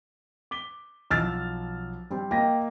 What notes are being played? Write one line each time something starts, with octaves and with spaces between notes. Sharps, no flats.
D6 B6 G7
B1 F3 E6 F6 A6
G3 C4
A#3 D#5 G5 A#6